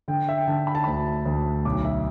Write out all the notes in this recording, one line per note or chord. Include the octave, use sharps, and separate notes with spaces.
D3 G5
E5
G5
D3 A5
B5
A5
D2 B5
D2
B1 D6
E5